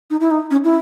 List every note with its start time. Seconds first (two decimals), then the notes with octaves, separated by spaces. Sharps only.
0.10 D#4
0.20 E4
0.31 D#4
0.51 C#4
0.64 E4